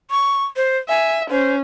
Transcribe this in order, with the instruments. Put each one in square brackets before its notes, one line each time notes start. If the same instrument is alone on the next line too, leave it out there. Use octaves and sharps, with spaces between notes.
[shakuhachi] C#6
C5
[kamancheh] E5 [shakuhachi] G#5
[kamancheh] C#4 [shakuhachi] C5